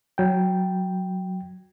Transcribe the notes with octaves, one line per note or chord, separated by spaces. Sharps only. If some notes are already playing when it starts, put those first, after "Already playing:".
F#3 G5